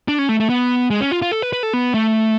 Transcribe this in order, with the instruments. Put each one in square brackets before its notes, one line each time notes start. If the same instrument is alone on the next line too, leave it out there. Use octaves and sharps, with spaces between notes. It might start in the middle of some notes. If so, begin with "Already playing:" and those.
[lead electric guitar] D4
C#4
A3
A3
B3
G#3
C#4
F4
F4
A4
B4
B4
A4
B3
A3